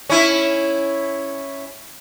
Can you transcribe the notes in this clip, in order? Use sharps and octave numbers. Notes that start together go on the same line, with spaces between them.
C#4 E4